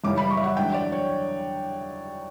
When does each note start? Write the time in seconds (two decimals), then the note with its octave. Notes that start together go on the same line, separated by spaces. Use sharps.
0.04 F#2 C#3 E3 G3 D6
0.17 B5
0.31 C#6
0.37 E5
0.44 F#5
0.57 E2 D3 F#3 G5
0.74 D5
0.92 C#5